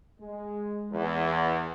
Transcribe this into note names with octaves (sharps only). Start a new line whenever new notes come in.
G#3
E2